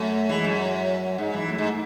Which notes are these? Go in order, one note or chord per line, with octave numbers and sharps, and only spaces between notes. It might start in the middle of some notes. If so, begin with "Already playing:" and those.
Already playing: F#2 A3
E3 G#3
F#2
F#3
G#2 G#3
E3
F#2 A3
G#2